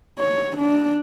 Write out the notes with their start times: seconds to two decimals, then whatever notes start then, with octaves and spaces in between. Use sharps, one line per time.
0.19 C#5
0.57 D4